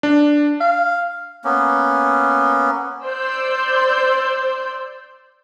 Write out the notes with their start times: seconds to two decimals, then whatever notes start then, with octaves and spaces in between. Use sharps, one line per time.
0.03 D4
0.60 F5
1.45 A#3 B3 C#4
3.05 C5 D5 C6 E6 G6